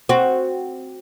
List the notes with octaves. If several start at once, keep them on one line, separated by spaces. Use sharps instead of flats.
C4 F#4